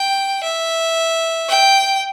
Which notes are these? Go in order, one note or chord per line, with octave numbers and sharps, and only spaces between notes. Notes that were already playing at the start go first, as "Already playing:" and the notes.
Already playing: G5
E5
G5